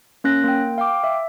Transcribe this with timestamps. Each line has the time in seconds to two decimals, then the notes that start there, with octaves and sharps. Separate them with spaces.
0.24 A#3 C#4 F#6 A#6
0.44 A#3 G5
0.78 F5 G5 D6
1.04 E5